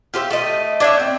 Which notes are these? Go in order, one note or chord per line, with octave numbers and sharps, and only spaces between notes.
F4 G4 C5 E5
A3 D#5
D4 C#5 E5
C4